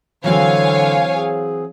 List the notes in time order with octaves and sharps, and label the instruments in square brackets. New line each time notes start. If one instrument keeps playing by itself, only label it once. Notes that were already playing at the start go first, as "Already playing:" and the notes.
[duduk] D3 [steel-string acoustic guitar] E3 F#3 C4 [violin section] C#5 F5 G#5
[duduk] G#4